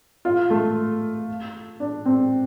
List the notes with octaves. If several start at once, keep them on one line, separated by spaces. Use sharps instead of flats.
F4
A3
D4
C4